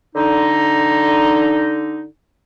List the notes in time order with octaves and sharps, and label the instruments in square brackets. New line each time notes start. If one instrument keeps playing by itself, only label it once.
[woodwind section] D3 D#4